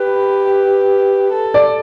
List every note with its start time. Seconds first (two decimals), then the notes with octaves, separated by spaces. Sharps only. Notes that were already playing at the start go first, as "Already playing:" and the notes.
Already playing: G4 B4
1.33 A4
1.54 D5